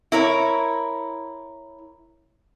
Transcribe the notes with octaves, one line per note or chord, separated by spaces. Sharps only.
E4 A#4 C#5